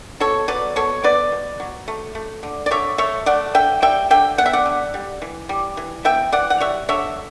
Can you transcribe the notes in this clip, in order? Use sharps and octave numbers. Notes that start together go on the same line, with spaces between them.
B2 A4 C#5
F#3 B4 D5
B2 A4 C#5
B3 B4 D5
B2
F#3
A3
A3
D3
D5
D3 C#5 E5
A3 C#5 E5
A3 D5 F#5
D3 E5 G5
G3 E5 G5
D3 E5 G5
B3 F#5
E5
D5 F#5
D3
G3
E3
G3
E3
B3 E5 G5
E3 D5 F#5
F#5
G3 C#5 E5
D3 C#5 E5